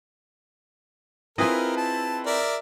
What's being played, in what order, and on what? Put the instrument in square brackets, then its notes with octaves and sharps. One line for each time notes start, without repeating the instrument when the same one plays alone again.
[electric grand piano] C4 E4 B4 [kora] F4 G#4 D#5 [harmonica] A#4
[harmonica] A5
A#4 D5 E5